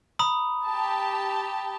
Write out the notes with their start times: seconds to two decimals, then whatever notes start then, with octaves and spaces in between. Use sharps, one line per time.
0.19 A#5 B5 D#6
0.67 G4 A5